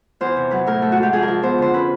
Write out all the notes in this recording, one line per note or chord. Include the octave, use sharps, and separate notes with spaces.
E2 C5
C3
F#3 B4
A2 A#4
A3 A4
F#4
G#2
G4
F2 G#4
A#4
F3
B3 C5
D3 C5
C#4 B4